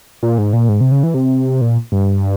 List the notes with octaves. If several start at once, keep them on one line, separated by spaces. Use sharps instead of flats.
A#2
G#2
A#2
G#2
C3
C#3
E3
C3
A#2
G2